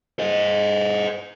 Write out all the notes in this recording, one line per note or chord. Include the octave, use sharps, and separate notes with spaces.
C5 D#5